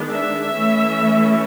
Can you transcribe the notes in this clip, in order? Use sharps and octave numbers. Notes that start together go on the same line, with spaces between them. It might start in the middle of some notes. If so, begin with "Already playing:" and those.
Already playing: D#3 G#3 B3 D4
E5
E3 A3 C#4